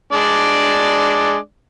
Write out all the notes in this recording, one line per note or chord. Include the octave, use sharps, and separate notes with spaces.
G#3 D4 D5